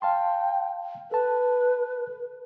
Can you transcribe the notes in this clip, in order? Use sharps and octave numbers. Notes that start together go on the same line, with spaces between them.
F5 G5 A5 C6
A4 B4 A5